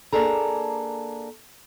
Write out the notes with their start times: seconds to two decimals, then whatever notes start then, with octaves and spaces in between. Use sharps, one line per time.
0.13 A#3 D4 G#4 A4 A#5